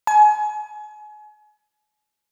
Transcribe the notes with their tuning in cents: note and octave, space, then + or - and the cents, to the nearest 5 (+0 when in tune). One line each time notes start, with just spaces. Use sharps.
G#5 +35